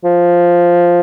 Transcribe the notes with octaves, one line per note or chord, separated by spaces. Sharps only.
F3